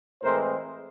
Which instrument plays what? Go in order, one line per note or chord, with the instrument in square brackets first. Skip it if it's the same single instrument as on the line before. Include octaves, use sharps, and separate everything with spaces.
[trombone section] A2 E3 G#3 C4 A#4 C5